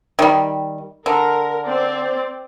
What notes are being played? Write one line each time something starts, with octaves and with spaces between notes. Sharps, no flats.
D#3 G3
D3 A#4
C4 D5